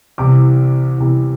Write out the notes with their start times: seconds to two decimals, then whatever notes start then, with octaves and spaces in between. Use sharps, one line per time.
0.18 C2 C3 E3 D6
0.98 C2 C3 E3